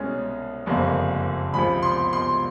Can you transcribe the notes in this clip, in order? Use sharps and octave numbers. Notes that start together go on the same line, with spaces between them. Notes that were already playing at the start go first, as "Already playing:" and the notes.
Already playing: C2 B2 G#3 C#4
F#1 F2 D3 G3 A#3
C#2 C3 F3 G#3 B5
C6
C6